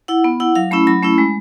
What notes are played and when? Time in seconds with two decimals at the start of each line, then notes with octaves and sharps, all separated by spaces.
0.08 E4 F#5
0.24 B3
0.40 E4 F#5
0.55 F#3 F5
0.71 A3 C#4 E4 B5
0.87 F#3 B5
1.03 A3 C#4 E4
1.18 G#3